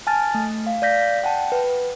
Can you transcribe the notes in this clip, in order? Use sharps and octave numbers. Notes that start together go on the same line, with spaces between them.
G#5 A5 F6 A6
A3
F5
D5 F5 G6 A#6 B6
F#5 G5 A5
B4